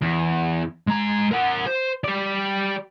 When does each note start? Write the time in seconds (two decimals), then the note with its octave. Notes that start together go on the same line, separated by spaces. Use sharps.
0.01 E2
0.87 G#3 A#5
1.31 A#4 F#5
1.66 C5
2.04 G4 D5